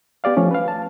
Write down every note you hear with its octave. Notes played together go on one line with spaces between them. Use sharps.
B3 G4 D5 F5
F3 A3 C#4
B4 F5
A5